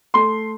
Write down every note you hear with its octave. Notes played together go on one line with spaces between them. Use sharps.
A3 C6